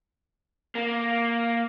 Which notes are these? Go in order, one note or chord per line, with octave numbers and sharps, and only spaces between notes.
A#3